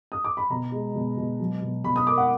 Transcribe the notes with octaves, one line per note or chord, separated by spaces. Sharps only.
D#6
D6
B5
B2 A#5
G#3
B2
B2
F#3
B2
B2 B5
D#6
A#3 D6
F#5